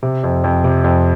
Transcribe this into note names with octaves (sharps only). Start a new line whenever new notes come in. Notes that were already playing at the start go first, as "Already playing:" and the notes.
C3
F2
F2
C3
F2